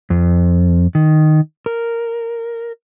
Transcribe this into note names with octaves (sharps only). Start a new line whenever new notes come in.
F2
D#3
A#4